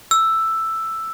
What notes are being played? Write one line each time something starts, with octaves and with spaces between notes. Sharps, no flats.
E6